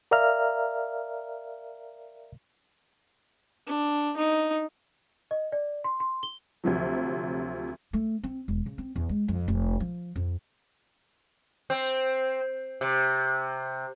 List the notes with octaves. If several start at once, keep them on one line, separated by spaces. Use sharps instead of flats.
A#4 D5 E5 F5 A#5 F6
D4
D#4
D#5
D5
C6
C6
G7
D2 C3 F3 F#3
A3
C4
E1
C#3
C4
E2
G#3
F2
F1
F3
F2
C4
C3